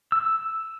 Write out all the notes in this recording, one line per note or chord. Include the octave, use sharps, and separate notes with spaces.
E6